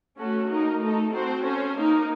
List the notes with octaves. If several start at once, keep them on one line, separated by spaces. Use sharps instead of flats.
A3 C#4 F#4 A4
A#3 D#4 A#4
A3 D#4 A4
C4 F#4 A4 C5
C#4 A4 C5
A#3 D#4 A#4